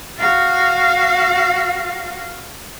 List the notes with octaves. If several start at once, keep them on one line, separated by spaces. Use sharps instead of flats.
F#4 F5